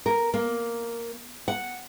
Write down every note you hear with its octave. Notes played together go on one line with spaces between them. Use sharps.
A#4
A#3
F#5